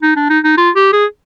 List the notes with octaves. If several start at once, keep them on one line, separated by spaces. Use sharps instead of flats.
D#4
D4
D#4
D#4
F4
G4
G#4